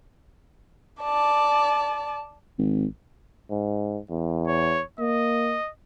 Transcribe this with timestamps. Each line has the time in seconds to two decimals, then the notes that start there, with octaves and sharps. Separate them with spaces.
1.02 D5 A5
2.58 G#1
3.50 G#2
4.10 E2
4.47 C#5
4.99 A#3 D#5